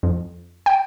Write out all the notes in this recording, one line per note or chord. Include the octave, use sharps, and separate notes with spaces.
F2
G5